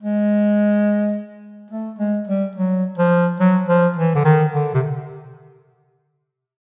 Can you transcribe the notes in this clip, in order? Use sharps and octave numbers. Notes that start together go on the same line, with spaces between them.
G#3
A3
G#3
G3
F#3
F3
F#3
F3
E3
D3
D#3
D3
C3